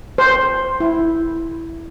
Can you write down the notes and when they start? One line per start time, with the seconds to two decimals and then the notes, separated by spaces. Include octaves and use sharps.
0.18 C5
0.80 E4